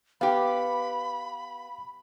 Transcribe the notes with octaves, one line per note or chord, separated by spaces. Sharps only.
B3 G4 F5 B5